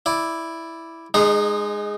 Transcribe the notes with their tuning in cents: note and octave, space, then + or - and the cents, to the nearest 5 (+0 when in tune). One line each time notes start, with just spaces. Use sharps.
E4 +0 D5 +0
G#3 +0 D#4 -35